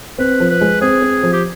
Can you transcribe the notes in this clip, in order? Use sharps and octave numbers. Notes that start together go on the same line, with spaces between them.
C4 B4
F3
B4
G#3
C4 G#4
C4
F3
G4